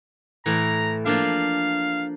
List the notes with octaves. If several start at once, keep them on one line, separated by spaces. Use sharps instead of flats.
A2 E3 A#5
F3 A#3 D4 F5